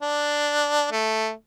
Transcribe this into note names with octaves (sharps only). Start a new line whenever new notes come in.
D4
A3